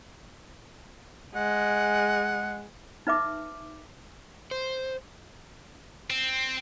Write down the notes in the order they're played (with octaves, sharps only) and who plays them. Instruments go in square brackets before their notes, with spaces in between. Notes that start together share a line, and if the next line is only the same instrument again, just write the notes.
[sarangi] G#3 [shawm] F#5
[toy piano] D#4 B4 E5 D6
[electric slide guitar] C5
[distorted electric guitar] C4